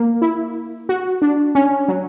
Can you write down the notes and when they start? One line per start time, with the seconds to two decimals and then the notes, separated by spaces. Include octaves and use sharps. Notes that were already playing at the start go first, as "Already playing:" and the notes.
Already playing: A#3
0.22 E4
0.89 F#4
1.22 D4
1.55 C#4
1.88 F#3